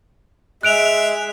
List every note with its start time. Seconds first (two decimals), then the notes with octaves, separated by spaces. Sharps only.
0.63 G#3 E5 F#6 D7 F7